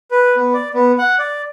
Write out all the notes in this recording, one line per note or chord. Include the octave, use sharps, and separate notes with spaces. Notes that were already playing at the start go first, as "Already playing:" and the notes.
B4
B3
D5
B3
F#5
D5